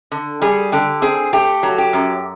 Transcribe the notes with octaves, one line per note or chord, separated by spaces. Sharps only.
D3
G3 G#4
D3 G4
C4 G#4
A3 G4
F#3
G4
F#2